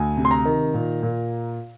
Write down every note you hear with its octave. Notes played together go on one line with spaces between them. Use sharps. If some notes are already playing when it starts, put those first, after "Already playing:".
Already playing: D2 G#5
C3
C6
A#5
D#3
A#2
A#2